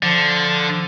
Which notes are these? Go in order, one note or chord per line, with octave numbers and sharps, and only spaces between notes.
D3 F3